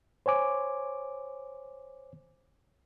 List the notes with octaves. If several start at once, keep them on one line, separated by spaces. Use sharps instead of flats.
C5 C#5 G#5 D6